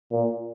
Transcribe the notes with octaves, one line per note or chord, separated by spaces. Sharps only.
A#2